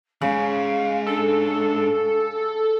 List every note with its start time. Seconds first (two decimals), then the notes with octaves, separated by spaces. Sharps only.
0.21 E2 G#2 C#3 F5
1.07 D4 A4